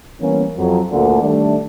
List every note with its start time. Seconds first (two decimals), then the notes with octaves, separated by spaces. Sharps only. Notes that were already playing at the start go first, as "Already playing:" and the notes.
0.21 E3 G3 A#3 B3 C#4
0.58 F2 F#3
0.91 D2 A#2 D3
1.22 D#3 G3 A3 D4